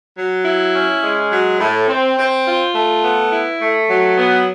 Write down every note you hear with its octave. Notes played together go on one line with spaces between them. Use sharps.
F#3
E4
C#4
G#3
F#3
A2
C4
C4
F4
A3
B3
E4
A3
F#3
B3